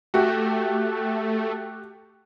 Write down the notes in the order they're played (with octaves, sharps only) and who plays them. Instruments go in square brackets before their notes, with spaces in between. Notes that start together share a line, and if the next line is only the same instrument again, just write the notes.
[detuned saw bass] A3 [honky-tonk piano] F#4 G4